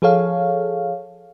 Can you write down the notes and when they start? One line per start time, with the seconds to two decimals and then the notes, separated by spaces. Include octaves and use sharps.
0.02 F3 G#4 A4 C#5 F5